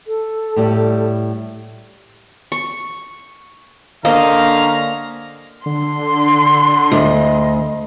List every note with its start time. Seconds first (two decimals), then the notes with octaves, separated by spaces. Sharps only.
0.07 A4
0.56 A2 G3 G4
2.52 C#6
4.05 D3 A#3 C#4 C5 D#5 F5 A#5
5.66 D3 C6
6.92 D2 D#5